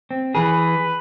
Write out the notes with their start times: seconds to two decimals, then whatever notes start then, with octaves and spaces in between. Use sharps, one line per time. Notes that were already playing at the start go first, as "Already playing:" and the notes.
0.11 C4
0.35 E3 G#4 B4